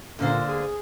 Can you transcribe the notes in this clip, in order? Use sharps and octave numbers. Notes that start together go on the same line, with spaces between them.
A#2 D3 A#3 C5
G#4